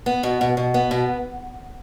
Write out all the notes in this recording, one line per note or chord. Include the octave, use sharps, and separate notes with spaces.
B3
B2
B2
B2
B3
B2